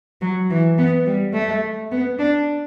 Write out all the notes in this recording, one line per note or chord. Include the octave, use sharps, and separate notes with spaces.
F#3
E3
B3
G3
A3
B3
D4